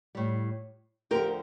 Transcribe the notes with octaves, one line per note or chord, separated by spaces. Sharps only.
A2 G3
D2 D3 F3 G4 A#4